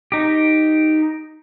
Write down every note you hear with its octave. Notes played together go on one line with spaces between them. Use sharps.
D#4 G4